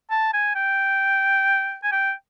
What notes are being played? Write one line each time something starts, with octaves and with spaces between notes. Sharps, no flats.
A5
G#5
G5
G#5
G5